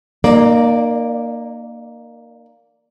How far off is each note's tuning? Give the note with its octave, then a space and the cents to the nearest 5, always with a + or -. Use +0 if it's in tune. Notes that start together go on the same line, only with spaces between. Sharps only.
A#3 +0 D#4 -35 D5 +0